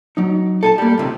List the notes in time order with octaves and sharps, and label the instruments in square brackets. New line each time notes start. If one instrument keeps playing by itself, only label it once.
[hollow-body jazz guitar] F#3 D#4
A4 G#5 A5
G3 A#3
C#2 C3 D#3